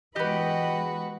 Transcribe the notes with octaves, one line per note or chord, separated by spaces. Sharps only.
E3 G#3 B3 F#4 G4 B4 D#5